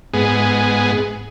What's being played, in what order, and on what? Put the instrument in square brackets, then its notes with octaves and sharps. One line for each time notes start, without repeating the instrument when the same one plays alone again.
[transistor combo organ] G#2 B3 G#4